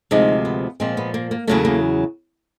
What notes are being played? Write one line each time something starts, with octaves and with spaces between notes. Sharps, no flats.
D2 C3 F3 G#3 D#4
B3
A#2 F3 G#3 C4
B3
A#3
A#3
E2 C#3 F#3 A3 A#3
A#3